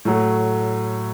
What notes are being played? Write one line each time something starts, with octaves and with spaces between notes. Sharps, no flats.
A2 F#3 A3